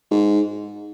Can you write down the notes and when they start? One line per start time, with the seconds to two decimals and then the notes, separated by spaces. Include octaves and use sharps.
0.11 G#2